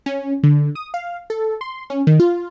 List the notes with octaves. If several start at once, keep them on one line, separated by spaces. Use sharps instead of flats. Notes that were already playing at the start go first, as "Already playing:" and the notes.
C#4
D3
D#6
F5
A4
C6
C#4
D#3
F4